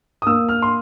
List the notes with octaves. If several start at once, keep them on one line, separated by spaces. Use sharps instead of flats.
D#6
A#3 E6
F6
C6